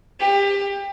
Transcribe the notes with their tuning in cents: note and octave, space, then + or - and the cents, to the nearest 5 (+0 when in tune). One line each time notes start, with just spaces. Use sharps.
G4 +25